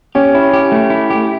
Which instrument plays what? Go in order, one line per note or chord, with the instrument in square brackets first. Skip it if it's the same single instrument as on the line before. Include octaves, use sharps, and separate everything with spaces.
[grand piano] C#4 [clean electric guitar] G4
[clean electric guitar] E4
G4
A3
E4
G4